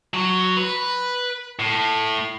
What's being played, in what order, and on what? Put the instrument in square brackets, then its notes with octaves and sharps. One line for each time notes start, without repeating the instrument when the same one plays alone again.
[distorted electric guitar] F#3
B4
A2